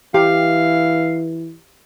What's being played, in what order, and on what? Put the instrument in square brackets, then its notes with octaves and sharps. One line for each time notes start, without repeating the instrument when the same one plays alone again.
[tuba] E3 [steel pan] G4 [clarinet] F5